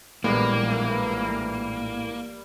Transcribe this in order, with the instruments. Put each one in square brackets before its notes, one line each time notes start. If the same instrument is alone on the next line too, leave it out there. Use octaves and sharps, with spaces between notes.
[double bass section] A#1 E3 [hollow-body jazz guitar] A2 G#3 B3 [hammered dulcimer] G3 [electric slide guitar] A#3